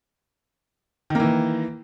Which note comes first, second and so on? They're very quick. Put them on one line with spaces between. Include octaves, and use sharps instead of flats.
D#3 A#3 E3